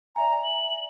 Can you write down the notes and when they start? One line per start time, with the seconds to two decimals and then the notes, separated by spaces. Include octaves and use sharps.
0.16 D5 E5 G#5 A#5
0.44 F#7